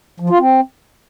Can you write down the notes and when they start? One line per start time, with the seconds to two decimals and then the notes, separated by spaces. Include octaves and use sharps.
0.20 F3
0.29 F4
0.39 C4